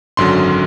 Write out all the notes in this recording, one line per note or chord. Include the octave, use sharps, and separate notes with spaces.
G#1 F#2 D3 F#3 C6